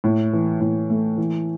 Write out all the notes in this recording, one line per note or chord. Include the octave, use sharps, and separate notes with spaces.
A2
E3
A2
A3
E3